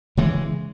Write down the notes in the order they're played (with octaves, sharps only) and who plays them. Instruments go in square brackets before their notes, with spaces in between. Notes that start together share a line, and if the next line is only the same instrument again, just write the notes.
[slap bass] C#3 E3 G#3